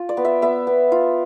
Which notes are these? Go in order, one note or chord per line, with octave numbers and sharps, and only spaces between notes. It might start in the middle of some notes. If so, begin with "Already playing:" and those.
Already playing: F4
D5
B3
E5
B3 E5
B3
F4